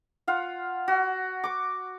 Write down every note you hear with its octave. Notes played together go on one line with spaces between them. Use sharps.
F4 F5 F#5
F#4
C#6 D6